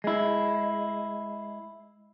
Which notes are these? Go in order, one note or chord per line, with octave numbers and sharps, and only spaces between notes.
G#3 E4